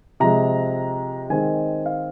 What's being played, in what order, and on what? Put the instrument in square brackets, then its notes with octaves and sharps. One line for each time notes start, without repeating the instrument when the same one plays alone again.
[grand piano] C3 F3 G#3 A#5
D#3 G#3 C4 G#5
F5